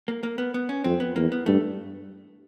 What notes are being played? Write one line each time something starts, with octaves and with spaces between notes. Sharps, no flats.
A#3
A#3
B3
B3
C#4
F2 C4
B3
E2 A#3
B3
G2 A3